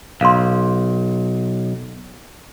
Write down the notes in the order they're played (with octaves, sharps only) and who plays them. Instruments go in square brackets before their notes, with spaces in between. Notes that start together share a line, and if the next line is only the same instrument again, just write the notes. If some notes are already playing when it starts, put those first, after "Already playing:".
[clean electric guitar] B1 [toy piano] F5 C6